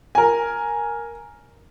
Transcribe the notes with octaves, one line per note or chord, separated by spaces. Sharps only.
A#4 G#5